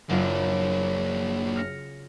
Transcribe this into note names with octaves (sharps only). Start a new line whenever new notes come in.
F#1 F#2 A#3 D4 F4
F6 A#6 C#7